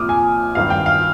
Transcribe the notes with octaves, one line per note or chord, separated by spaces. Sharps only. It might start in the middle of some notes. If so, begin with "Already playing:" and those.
Already playing: C2 A#2 F3 D6 D#6 F6
G#5
G#1 G2 D#3 G3 F5
G5
F5